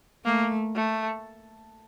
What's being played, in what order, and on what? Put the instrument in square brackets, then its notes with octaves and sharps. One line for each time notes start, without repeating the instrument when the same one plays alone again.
[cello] A3 [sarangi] A#3
[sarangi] A3